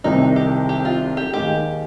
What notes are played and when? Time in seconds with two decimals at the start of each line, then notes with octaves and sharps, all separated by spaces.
0.04 C2 C3 D#3 D#4
0.36 G4
0.69 G4
0.85 F4
1.17 G4
1.33 D#2 D#3 G#3 D#4 G4